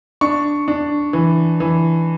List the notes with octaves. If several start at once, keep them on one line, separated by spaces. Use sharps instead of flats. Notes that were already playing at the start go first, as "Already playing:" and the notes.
D4 C#6
D4
E3
E3